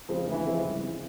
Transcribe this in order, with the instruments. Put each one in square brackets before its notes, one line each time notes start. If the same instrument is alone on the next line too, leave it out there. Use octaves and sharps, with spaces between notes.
[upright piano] C#3 F3 G#3 C4
[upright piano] D2 [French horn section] E3
[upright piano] C#3 F3 G#3 C4
C2
C3 E3